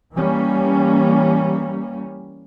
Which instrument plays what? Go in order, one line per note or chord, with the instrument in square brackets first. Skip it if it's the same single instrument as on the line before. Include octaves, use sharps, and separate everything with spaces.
[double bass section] E3 G3 A#3 C#4